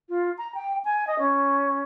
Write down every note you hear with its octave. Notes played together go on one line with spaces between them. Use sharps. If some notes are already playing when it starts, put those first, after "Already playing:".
F4
A#5
G5
G#5
D#5
C#4